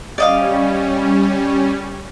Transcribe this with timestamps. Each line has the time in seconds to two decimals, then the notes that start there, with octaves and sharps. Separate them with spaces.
0.18 G3 C#4 D5 D#5 F5